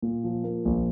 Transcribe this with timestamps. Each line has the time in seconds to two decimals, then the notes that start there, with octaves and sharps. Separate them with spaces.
0.02 A#2
0.24 F3
0.44 A#3
0.65 A#1